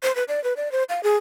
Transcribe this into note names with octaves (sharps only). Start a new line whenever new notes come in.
C5
B4
D5
B4
D5
C5
F5
G#4